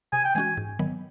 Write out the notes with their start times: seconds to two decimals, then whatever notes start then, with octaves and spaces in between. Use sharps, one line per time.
0.13 C3 G#5
0.24 G5
0.35 E3 G#3 C#4 F#4 G#5
0.57 G#2
0.79 D#3 F#3 B3